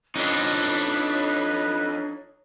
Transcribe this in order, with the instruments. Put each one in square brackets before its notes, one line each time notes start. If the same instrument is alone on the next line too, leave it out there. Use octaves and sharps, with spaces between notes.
[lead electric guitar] F2 [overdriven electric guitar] D4 D#4 [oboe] B4 [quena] C#5